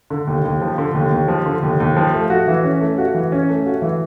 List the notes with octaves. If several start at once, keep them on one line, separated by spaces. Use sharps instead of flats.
D3
D#2
D#2
F3
D3
D#2
D#2
F3
D3
D#2
D#2
F3
A3
F#4
E3
C#4
A3
F#4
E3
C#4
A3
F#4
E3